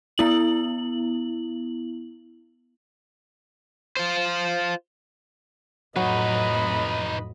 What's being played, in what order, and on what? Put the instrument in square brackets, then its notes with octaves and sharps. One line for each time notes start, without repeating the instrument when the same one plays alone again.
[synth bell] B3 E4 F#7
[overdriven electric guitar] F4 C5
[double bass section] F2 A2 [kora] F#3 [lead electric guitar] D#4 B4 [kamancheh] D#5 B5